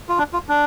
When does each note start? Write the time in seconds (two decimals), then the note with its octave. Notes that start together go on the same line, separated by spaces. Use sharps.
0.09 F4
0.18 D4
0.33 F4
0.49 D4